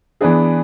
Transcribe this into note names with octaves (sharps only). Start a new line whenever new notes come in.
E3 B3 D4 G#4